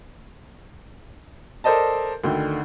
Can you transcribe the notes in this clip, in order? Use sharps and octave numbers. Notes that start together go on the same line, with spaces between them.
A4 A#4 C5 D5 D#5 A5
D2 D3 D#3 G5